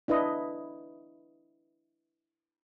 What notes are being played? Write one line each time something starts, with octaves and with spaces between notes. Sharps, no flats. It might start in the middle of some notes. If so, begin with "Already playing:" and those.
D4 E4 B4 D#5